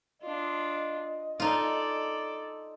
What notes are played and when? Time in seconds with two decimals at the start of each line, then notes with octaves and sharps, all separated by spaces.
0.22 D4 F4 D#5
1.40 D#4 F4 A4 D5